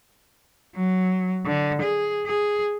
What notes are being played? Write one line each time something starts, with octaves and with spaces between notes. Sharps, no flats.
F#3
D3
G#4
G#4